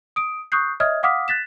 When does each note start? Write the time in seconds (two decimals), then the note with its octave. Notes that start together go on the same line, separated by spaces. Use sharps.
0.16 D#6 D7
0.52 C#6 D#6 F#6 G6 C7
0.80 C#5 D#5 E5 D#6 F6 G#6
1.03 F5 F#5 D6 D#6 F6 B6
1.28 F#6 A6 B6 E7